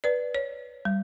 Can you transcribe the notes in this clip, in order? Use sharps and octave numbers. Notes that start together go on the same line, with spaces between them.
B4 D5
C#5
G3